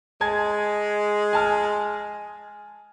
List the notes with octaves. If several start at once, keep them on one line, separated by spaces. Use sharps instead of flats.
G#3 G#5 A5 G#6
G#5 A5 F6